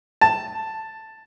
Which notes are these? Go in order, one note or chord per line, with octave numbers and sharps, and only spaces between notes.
A5